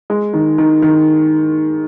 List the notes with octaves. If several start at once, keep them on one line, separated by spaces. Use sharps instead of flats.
G#3
D#3
D#3
D#3